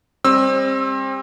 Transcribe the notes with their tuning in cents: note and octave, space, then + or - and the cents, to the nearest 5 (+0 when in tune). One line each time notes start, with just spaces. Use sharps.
G3 +35 C4 +30 E6 -5